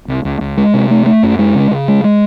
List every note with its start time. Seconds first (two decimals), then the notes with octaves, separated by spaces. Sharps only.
0.08 C2
0.25 C#2
0.41 C#2
0.57 G#3
0.74 C3
0.91 A3
1.06 A3
1.23 F#2
1.39 G#3
1.55 C#3
1.71 C#3
1.88 G#3
2.04 G#3